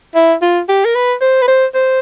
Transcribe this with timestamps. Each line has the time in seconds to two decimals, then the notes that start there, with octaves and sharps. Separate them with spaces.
0.15 E4
0.42 F4
0.69 G4
0.85 A#4
0.95 B4
1.21 C5
1.42 B4
1.48 C5
1.74 C5